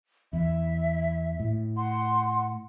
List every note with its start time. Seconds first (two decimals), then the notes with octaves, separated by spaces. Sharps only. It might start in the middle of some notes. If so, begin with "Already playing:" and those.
0.33 E2 E5
1.40 A2
1.77 F#5 C6